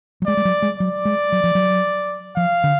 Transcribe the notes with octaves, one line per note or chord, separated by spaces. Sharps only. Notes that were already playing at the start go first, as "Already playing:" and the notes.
F#3
G#3 D5
G#3
F#3
G#3
F#3 D5
G#3
F#3
F3
F#3
F3 F5
D3